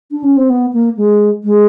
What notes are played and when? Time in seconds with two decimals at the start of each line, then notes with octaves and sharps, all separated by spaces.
0.11 D4
0.24 C#4
0.37 C4
0.50 B3
0.73 A#3
0.97 G#3
1.44 G#3